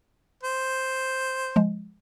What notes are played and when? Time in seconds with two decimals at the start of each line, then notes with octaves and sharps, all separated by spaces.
0.43 C5
1.56 F3 G#3